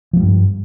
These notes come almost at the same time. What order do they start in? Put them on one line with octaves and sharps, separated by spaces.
F3 A3 G3 G2